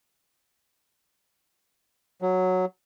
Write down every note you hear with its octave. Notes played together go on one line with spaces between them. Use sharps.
F#3